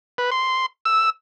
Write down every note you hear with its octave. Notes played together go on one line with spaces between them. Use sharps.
B4
C6
E6